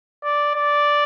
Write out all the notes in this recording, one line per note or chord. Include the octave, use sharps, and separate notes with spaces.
D5
D5